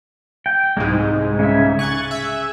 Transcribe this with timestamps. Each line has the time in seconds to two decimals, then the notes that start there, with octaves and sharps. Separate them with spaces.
0.46 G5
0.77 C2 G#2 G#3 D#4
1.39 C#3 C#4 E5
1.79 G#4 C#6 F#6 A6
2.11 E5